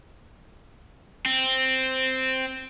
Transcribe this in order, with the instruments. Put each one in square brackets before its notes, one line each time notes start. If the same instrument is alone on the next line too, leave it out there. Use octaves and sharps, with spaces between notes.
[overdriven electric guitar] C4